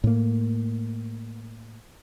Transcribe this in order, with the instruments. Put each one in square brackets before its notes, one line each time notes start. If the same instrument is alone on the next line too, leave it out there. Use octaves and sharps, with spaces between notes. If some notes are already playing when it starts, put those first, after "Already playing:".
[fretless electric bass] A2 A#3